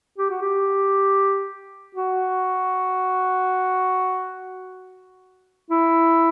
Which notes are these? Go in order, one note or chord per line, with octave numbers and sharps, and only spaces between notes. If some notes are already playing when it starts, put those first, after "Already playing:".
G4
F#4
G4
F#4
E4